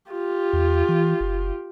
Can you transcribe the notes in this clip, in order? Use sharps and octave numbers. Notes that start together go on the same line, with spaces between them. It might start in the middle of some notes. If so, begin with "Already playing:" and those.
F4 G4
E2
E3
F#1